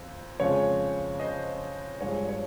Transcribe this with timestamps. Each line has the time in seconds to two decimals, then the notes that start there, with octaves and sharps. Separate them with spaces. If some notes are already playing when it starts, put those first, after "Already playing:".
Already playing: F2
0.40 F2 C#3 F3 G#3 C#5
1.20 C5 D#5
2.01 G2 F3 G#3 C#5
2.29 C#5